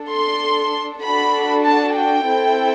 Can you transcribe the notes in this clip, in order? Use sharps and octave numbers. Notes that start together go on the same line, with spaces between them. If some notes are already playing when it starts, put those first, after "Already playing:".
Already playing: D4 A4
C6
D4 F#4 A4 B5
A5
G5
C4 E4 A4